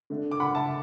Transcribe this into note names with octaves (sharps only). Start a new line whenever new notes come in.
D3 A3 D4
D6
F#5 B5
E5 A5